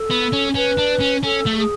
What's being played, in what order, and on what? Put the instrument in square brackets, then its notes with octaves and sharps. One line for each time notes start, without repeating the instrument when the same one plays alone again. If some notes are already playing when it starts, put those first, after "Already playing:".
Already playing: [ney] A4
[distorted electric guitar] B3
C#4
[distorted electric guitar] C#4 [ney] B4
[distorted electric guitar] D4
C#4
[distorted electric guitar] C#4 [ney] A4
[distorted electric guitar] A3
[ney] G#4